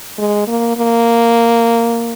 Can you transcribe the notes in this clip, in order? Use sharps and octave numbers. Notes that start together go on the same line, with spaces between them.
G#3
A#3
A#3